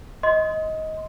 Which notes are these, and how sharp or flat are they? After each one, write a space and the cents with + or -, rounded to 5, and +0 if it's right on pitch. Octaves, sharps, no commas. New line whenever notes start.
D#5 +20 C6 -10